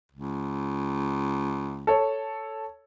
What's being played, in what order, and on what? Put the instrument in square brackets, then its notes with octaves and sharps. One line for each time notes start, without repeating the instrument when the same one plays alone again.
[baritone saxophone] C#2
[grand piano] A4 C#5